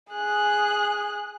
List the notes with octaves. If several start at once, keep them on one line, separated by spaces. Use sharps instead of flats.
G#4 F#6